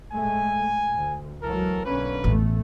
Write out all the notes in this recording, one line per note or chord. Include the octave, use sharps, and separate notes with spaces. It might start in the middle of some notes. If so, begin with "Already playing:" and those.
A2 G#3 A3 G#5
D2
C#2 E3 F#3 A4 A#4
B1 D3 A#3 C#4 B4
A1 E2 A3